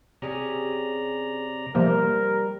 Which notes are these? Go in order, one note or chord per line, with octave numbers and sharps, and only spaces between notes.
C3 C#4 G4 G#4 D5 A#5
C3 F3 G3 A#3 A#4 C5